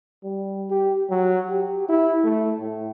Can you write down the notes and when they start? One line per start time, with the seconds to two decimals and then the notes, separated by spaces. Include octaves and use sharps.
0.23 G3
0.70 G4
1.10 F#3
1.50 G4
1.89 E4
2.24 A3
2.60 A2